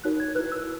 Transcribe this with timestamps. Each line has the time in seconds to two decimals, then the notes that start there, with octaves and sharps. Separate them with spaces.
0.04 D#4 F#4 A#4 C#5 F#6
0.20 G#6
0.35 B4 F#6
0.39 E4
0.52 E6